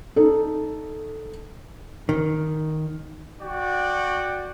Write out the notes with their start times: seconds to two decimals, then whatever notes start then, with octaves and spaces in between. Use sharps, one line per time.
0.16 D#4 A4
2.09 D#3
3.40 F#4 D5 G5